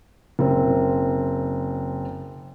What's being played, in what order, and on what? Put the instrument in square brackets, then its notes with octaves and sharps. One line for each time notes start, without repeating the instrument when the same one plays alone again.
[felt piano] F#1 C4